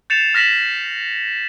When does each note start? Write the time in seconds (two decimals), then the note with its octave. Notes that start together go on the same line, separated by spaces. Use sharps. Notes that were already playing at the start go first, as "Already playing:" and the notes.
0.10 G6 A6 C7 C#7 E7 F7
0.35 F6 A#6 B6 E7 F#7